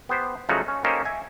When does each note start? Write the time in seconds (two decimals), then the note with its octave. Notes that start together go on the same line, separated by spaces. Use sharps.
0.09 B3 G4 C5
0.49 C#3 F3 F#3 A3 D#4 F#4
0.68 C#4
0.84 A#3 C#4 D#4 G4 A4 C5
1.05 E5 G#5